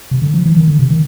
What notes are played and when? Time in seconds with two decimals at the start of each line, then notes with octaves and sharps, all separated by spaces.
0.11 C3
0.22 D3
0.34 F3
0.46 E3
0.57 D#3
0.68 D3
0.79 C3
0.91 D#3